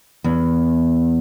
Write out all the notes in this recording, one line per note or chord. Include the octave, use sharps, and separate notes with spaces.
E2